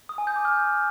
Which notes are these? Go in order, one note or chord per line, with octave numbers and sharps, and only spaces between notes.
D#6
G#5
G6
D6
F6